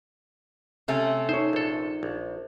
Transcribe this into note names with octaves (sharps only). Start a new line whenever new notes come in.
C3 A3 C#4
D#4 C5 C#5
A#1 A4
A#1